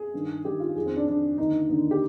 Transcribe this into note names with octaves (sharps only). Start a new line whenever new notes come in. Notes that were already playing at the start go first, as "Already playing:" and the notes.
Already playing: G#4
G2 D#3
G2 D#3 G4
F4
F2 D#3 G#4
C4
D4
F2 D#3 D4
D#2 D3 D#4
D#2 D3
G4